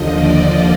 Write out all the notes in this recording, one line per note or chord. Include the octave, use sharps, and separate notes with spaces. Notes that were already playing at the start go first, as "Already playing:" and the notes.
Already playing: D#2 D3 F3 D#5
D5